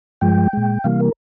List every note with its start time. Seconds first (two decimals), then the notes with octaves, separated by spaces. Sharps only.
0.21 G2 F3 G#3 G5
0.53 A#2 G#3
0.84 C3 E3 G3 A#3 F5
1.00 A#4